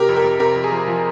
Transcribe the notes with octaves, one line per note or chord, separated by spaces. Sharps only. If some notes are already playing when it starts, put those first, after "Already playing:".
Already playing: C3 G4 A#4
F2
G4 A#4
F2
C3 G4 A#4
F2
G#4
F3
F3